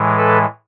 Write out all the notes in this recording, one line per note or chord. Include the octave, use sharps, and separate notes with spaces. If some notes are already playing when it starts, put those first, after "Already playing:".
Already playing: A2 E3 G#3
A4 B4